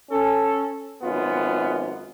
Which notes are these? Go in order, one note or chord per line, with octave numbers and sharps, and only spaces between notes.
C#4 A4
G#1 F#2 B3 F4